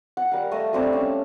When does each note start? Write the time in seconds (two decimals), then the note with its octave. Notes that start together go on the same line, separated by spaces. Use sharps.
0.17 F#5
0.32 G3 A#4 F5
0.52 A3 D#5 D#6
0.73 G3 C4 D4 A4
0.93 C#4